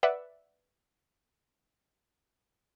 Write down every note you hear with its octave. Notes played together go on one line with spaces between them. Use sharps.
B4 D5 E5 F#5